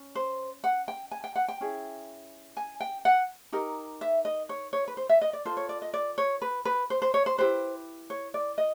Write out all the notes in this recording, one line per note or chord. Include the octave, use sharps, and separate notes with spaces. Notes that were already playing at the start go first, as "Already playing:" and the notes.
Already playing: C#4
C5
F#5
G5
G#5
G5
F#5
G5
C#4 E4 G#4
G#5
G5
F#5
D#4 G4 A#4
E5
D#5
C#5
C#5
B4
C5
E5
D#5
D5
F4 A4 C5
C#5
D5
D#5
D5
C#5
B4
B4
C5
C5
C#5
C5
E4 G4 B4 C5
C#5
D5
D#5